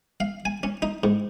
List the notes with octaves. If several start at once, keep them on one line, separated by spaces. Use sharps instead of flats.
F5
G#5
C#4
D#4
G#2